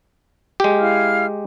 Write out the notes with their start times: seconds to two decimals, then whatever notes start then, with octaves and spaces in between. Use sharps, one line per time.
0.60 G#3 G4
0.79 E4 F5 F6